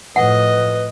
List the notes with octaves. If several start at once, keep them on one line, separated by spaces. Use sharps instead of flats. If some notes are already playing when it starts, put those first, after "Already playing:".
A2 F3 B4 D#5 F#5